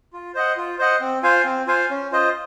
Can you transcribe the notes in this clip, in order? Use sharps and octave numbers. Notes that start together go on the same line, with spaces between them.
F4
C5 D#5 F#5
F4
C5 D#5 F#5
C4
F4 C5 F5 G#5
C4
F4 C5 F5 G#5
C#4
F4 C5 D#5